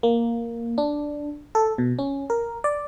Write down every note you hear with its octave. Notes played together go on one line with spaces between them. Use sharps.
A#3
D4
A4
B2
C#4
A#4
D5